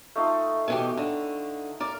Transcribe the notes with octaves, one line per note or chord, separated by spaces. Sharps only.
A3 D#4 F4
B2 E3 G4
D3
A#4 D5